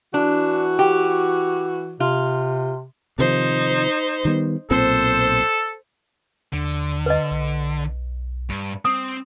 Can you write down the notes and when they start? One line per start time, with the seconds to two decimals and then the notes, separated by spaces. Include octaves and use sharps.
0.14 E3 D4 F#4
0.79 G4
2.00 C3 F4
3.19 C3 D#3 F3 D#4 C5
4.25 D#3 G3 B3
4.71 B1 A#2 C4 A4 C5
6.53 D#2 D3
7.06 B4 D#5
7.31 B1
8.49 G2
8.85 C4 D#6